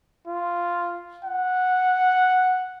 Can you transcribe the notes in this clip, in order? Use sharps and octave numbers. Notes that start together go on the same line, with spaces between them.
F4
F#5